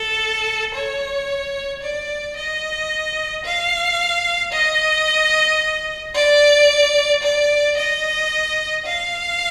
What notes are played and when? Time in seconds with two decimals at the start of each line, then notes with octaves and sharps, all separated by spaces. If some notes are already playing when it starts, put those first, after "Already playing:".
Already playing: A4
0.74 C#5
1.82 D5
2.37 D#5
3.45 F5
4.52 D#5
6.15 D5
7.23 D5
7.77 D#5
8.85 F5